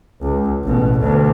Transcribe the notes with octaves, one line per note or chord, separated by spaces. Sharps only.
C#2
A1 B2
D2 B2